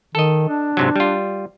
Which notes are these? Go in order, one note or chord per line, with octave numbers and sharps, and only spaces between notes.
D#3 A4 D#5
D4
G#2 C3 F#3
G3 F4